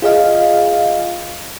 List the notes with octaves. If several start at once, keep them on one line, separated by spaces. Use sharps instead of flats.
F4 G#4 D#5 F5